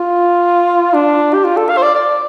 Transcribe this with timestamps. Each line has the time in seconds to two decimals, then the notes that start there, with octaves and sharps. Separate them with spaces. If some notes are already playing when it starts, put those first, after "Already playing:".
Already playing: F4
0.94 D4
1.34 G4
1.44 F4
1.57 A4
1.70 F5
1.77 C5
1.83 D5
1.95 D5